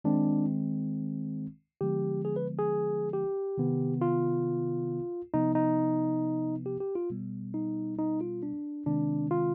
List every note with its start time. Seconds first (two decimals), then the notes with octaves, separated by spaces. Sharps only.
0.04 D#3 G#3 C4 D4
1.81 D3 F3 G#3 B3 G4
2.25 G#4
2.36 B4
2.59 G#4
3.13 G4
3.58 C3 D#3 B3
4.01 F4
5.34 C3 F3 B3 D#4
5.55 D#4
6.66 G4
6.80 G4
6.95 F4
7.10 B2 G3 B3
7.54 D#4
7.99 D#4
8.21 F4
8.43 D4
8.86 C3 D#3 G#3 C4 D4
9.31 F4